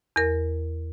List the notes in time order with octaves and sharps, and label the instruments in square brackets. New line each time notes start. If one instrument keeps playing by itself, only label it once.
[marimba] E2 A#4